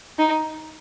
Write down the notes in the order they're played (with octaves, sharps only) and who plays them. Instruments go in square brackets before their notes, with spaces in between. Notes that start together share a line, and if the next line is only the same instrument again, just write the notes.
[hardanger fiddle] D#4